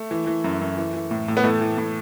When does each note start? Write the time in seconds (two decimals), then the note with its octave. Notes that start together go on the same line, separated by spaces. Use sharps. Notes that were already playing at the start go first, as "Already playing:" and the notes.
Already playing: A3
0.11 E3
0.27 E3
0.44 F#2
0.61 F#2
0.77 E3
0.94 E3
1.11 A2
1.28 A2
1.37 B3
1.44 E3 A3
1.61 E3
1.78 A2